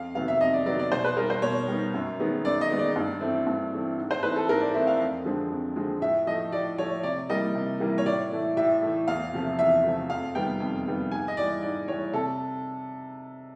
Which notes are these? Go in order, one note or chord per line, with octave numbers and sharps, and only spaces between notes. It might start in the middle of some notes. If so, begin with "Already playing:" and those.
Already playing: F2 F5
C3 D#3 F#3 B3 F5
E5
F2 D#5
D5
C3 D#3 F#3 B3 D5
D5
B2 C5
B4
G3 B3 D#4 A#4
C5
B2 C#5
G3 B3 D#4
F#2
D#3 G#3 B3 D#4
F#2 D5
D#5
D#3 G#3 B3 D#4
D5
G2
E3 A3 C4
G2
E3 A3 C4
G#2
C5
E3 A3 C4 D#4 B4
A4
G#2 A#4
D5
E3 A3 C4 D#4 E5
F5
F2
D3 F3 G#3 C4
F2
D3 F3 G#3 C4
A2 E5
F3 A3 D#5
A2 D5
F3 A3 C#5
C3 D5
E3 G3 A#3 D#5
C3
E3 G3 A#3
C#5
A2 D5
E3 A3
A2 E5
E3 A3
E2 F5
C3 F3 A3
E2 E5
C3 F3 A3
F2 F5
C3 D#3 G3 B3 G5
F2
C3 D#3 G3 B3
G#2 G#5
D#5
E3 G3 D5
G#2 D5
E3 G3 C#5
C3 A4